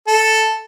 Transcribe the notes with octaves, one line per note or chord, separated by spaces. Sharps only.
A4